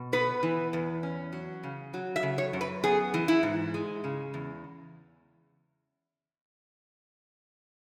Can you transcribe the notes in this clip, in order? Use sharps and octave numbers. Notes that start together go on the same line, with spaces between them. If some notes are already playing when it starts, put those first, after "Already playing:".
Already playing: B2
B3 B4
E3
E2
C#4
F#3
C#3
F#3
E5
C#3
C#5
F#2
B4
B3 G#4
E3
E4
G#2
G#3
C#3
E2